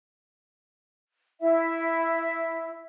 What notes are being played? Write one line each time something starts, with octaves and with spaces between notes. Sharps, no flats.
E4 E5